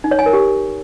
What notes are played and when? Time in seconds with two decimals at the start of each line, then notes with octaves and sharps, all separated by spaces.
0.04 D#4
0.11 C#5
0.19 G#5
0.26 A#4
0.33 G4